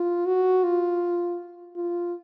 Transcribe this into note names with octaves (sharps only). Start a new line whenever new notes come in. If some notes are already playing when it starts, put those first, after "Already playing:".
Already playing: F4
F#4
F4
F4